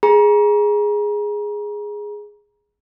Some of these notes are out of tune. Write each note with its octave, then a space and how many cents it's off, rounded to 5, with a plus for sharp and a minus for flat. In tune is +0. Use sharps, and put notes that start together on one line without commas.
G#4 +0 A#5 +35